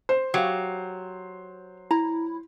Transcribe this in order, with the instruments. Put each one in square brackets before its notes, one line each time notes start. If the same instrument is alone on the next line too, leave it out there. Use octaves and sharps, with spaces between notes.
[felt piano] C5
[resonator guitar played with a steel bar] F#3 [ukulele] G4 F5
[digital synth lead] E4 [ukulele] A#5